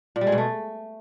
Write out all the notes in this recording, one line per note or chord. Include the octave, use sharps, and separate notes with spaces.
A#2
G3
G#3
B2
A3